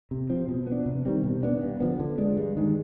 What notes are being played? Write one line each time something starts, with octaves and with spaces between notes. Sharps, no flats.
C3
F3 C4
B2
B3
D4
C3
D#3 G3 C4
B2
B3 D4
G2
D3 F3 B3
D3
G#3 D4
G2
D#3 G#3